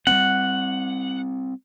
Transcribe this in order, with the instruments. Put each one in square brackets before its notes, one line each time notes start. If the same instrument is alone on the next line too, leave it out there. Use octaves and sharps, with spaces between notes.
[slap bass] G3 A#3 C4 [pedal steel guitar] F#5